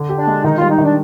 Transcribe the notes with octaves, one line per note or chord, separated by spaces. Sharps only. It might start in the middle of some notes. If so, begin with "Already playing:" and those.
Already playing: D3
G4
D4
G#3
D#3 D#4
G3 F4
D#4
D#3 D4